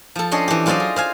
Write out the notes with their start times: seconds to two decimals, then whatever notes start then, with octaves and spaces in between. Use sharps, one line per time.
0.16 F3 A4
0.31 C#4 D4 C#5 D#5 C6
0.48 E3 G4
0.66 F#3 F4 C5 D5 D#5 F5
0.80 G#4
0.96 C5 F5 G#5